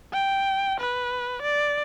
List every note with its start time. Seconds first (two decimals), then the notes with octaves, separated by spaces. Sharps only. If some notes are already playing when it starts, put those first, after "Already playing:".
0.13 G5
0.80 B4
1.42 D5